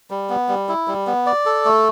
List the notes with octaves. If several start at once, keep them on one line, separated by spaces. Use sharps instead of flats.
G3
B3
G3
E4
G3
B3
D5
A4
A3